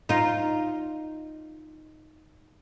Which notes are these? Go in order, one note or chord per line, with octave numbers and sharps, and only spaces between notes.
D#4 F4